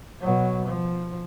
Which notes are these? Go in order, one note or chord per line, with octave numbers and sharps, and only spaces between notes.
B2 F#3
F3